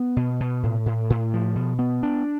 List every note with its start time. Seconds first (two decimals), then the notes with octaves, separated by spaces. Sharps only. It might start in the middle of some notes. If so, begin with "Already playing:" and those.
Already playing: B3
0.16 B2
0.40 B2
0.63 A2
0.86 A2
1.10 A2
1.34 F3
1.56 B2
1.79 B3
2.03 D4